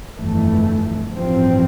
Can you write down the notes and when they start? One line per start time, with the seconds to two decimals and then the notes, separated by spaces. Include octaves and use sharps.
0.17 G1 F2 E3 A3
1.13 A1 G2 F3 C4